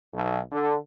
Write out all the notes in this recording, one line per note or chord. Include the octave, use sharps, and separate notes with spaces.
B1
D3